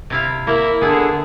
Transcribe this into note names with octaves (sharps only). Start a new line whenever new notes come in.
C3 E4 F5
A#3 E4
D3 B3 E4 G#4